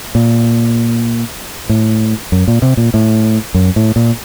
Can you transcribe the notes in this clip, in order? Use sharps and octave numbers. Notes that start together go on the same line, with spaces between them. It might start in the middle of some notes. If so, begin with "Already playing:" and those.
A#2
A2
F#2
A#2
C3
A#2
A2
F#2
A2
A#2